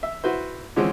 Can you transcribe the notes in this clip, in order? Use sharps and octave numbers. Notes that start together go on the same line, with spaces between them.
E5
E4 F#4 B4 C5
D3 E3 F3 G#3 C4 C#4